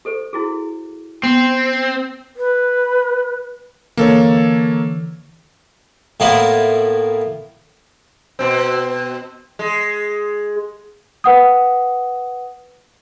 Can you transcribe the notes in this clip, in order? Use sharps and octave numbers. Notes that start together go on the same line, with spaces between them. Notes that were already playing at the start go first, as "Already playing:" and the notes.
G4 A4 C5
E4 F#4 G#4
B3 C4
B4
D3 E3 A#3 A4 C#5
A2 A#3 B3 E4 F4
B2 C4
G#3
B4 F#5 D#6